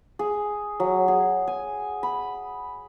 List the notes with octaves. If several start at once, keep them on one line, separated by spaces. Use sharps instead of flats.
G#4
F#3
G#4
G#5
B5